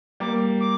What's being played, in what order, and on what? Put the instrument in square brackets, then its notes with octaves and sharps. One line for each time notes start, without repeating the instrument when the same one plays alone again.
[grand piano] G3 A#3 [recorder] D6
[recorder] D6